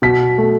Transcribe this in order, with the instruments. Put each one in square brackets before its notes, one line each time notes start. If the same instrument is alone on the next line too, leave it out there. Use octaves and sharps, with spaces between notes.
[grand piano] B2 B6
A3